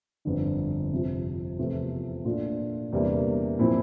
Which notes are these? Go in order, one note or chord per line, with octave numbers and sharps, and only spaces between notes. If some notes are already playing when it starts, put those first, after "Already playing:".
G1 F2 D3
F2 C3 F3
E2 C3 F3 A3
A#2 A3 D4 F4
E2 C3 G3 A#3 D4
A#2 F3 C4 E4